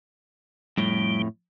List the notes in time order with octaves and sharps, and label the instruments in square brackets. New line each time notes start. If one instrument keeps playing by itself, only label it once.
[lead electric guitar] F2 A2 [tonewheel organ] G3